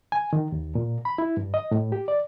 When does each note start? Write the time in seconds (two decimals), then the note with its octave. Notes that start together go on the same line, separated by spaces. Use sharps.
0.12 G#5
0.33 D#3
0.52 D#2
0.75 A#2
1.05 B5
1.18 E4
1.37 G2
1.54 D#5
1.71 A2
1.92 G4
2.08 D5